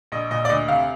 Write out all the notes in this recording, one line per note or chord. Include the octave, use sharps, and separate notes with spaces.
A#1 D#5
A#2 D#5
D5
D2 D#5
C3 F5